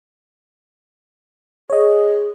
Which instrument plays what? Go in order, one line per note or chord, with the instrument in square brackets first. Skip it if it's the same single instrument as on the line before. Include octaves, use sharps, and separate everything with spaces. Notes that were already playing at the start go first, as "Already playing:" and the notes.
[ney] G#4 [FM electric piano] C#5 D#5